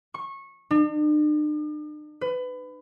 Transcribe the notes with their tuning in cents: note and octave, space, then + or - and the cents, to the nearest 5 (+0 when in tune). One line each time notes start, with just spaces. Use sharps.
C#6 -20
D4 +45
B4 +25